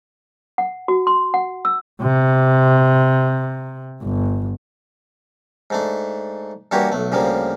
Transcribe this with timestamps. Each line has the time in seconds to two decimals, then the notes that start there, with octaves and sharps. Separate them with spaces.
0.58 F#5
0.88 F#4
1.07 C6
1.34 F#5
1.65 E6
2.02 C3
4.03 G1
5.70 G#2 A3 D4
6.71 G2 E3 A#3 F#4 G4 C#5
6.92 B1 A3
7.12 D2 C#3 F3 G3 A#3